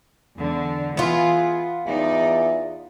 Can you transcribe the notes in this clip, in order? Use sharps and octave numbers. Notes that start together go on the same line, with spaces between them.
E2 D3
E3 B3 F4 G#4
E2 D#4 D5